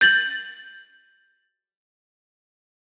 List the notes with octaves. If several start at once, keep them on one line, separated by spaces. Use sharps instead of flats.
G6 A6 F#7